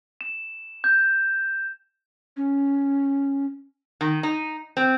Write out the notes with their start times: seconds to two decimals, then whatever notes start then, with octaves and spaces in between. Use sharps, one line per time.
0.21 E7
0.84 G6
2.37 C#4
4.01 D#3
4.23 D#4
4.77 C4